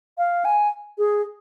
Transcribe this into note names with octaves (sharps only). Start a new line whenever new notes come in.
F5
G#5
G#4